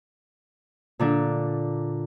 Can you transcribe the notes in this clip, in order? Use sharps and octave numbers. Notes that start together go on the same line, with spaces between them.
A#2 D3 D4